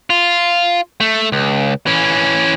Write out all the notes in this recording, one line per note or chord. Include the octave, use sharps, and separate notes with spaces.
F4
A3
C#2
E3 C#4